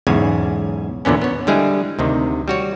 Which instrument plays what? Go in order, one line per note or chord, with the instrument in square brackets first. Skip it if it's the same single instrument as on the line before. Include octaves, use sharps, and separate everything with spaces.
[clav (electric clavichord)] B1 E2 G#2 C#3 G#5
E2 A#2 D3 B3 C#4
B3 C#5
D3 G3 G#3 E4 G#4
D2 C3 D#3
G3 F#4 C#5